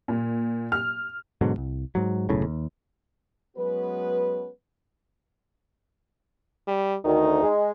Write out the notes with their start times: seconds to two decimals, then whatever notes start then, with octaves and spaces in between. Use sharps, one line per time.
0.08 A#2
0.72 F6
1.41 G#2 B2 D3 F#3
1.54 D1 C2
1.95 G#2 F#3
2.29 F#1 B1 A2 C#3
2.44 D#2
3.57 F#3 G#3 B3 C#4 F#4 B4
6.67 G3
7.05 D2 D#3 D#4
7.43 G#3